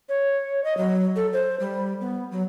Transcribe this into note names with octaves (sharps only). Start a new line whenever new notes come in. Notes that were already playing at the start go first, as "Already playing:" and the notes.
C#5
D#5
F#3
A4
C5
G3
B3
F#3